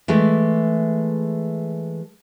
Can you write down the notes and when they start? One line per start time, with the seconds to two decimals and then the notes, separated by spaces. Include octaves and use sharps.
0.08 E3 G#3 A3 G#4